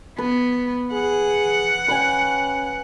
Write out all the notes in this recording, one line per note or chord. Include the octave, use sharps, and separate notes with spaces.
B3 B4
G#4 F#5
C#4 B4 G5 G#5